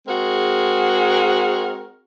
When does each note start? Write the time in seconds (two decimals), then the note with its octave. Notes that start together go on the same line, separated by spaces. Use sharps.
0.08 G#3 C4 F#4 G#4 A#4